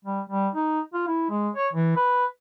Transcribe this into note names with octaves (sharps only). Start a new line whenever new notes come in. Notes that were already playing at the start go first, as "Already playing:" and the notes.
G3
G3
D#4
F4
E4
G#3
C#5
E3
B4